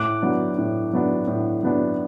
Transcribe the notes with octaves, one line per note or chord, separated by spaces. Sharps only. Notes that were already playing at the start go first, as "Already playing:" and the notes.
Already playing: A2 D6 F#6
F#3 B3 D4
A2
F#3 B3 D4
A2
F#3 B3 D4